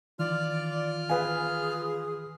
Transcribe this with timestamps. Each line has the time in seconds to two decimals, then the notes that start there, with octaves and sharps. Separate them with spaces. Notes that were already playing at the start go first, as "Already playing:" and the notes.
0.19 D#3 E3 F4 D5 F6
1.09 G#4 B4 F5 G#5